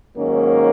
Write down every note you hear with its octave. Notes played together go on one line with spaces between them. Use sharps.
G#2 D#3 F#3 A#3 C#4